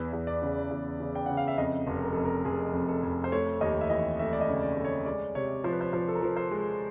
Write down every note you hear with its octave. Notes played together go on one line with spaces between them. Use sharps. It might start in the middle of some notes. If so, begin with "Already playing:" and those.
Already playing: E2 B4
E2
D5
C#3
E2
C#3
G5
C#3 F#5
F5
E5
F2 D#5
F1
A#4
F2 A4
A#4
F1 G#4
F2
A4
F2
C5
A3 C#5
D#2 D#5
E5
E3 D#5
A3 E5
D5
D#5
C#3
D5
A3
C#5
G#3 D5
C3 C#5
F3 C5
B4
C5
F3 C5
A4
A#4
F3
C5
G#3